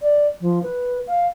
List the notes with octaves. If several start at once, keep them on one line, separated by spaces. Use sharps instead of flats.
D5
F3
B4
F5